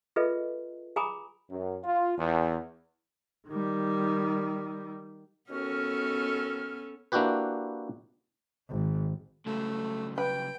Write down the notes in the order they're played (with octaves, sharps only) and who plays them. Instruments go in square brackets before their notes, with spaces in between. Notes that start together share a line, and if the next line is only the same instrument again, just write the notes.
[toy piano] F4 G#4 A4 B4 D#5 E5
G#4 G#5 A#5 B5 D6 D#6
[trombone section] F#2
F4
E2
[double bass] D#3 G3
[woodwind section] D#2 F#4 F6 [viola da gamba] B3 C#4 A4
[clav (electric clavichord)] A#3 D4 E4 F#4 G4 B4
[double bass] G#1
[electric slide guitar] C#3 F#3 G3 [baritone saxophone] A3
[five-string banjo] B4 [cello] G5